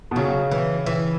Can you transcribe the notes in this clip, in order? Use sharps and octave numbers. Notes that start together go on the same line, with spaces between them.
B2
C#3 F#3
E3
E3